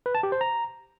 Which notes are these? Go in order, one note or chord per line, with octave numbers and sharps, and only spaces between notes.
B4
A5
G4
C5
A#5